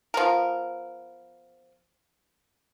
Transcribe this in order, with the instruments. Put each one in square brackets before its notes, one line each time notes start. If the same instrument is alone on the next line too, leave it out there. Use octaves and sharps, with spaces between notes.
[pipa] F3 B3 A#4